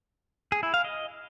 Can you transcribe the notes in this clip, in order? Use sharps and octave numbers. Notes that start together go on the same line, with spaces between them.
G#4
E4
F5
D#5